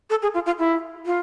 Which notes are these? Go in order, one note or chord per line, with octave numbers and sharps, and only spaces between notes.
A4
G#4
F4
F4
E4
F4